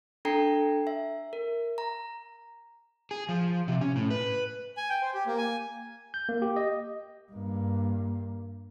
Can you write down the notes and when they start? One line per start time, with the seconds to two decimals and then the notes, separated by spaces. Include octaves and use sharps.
0.25 D4 A4 G5 A#5 C7
0.87 E5
1.33 A#4
1.78 A#5
3.11 G#4
3.29 F3
3.68 C3
3.81 C#4
3.96 A2
4.10 B4
4.77 G#5
4.89 G5
5.02 C5
5.14 G4
5.26 A#3
5.38 G#5
6.14 G6
6.29 A#3
6.42 G4
6.56 D#5
7.32 G2 A#3